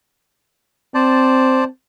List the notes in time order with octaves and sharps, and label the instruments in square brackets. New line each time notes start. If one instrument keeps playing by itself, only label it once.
[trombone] C4 [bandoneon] C5 D5 A5